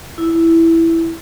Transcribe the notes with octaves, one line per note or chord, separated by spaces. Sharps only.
E4